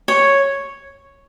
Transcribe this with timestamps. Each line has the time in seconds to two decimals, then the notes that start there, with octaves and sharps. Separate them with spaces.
0.08 C#5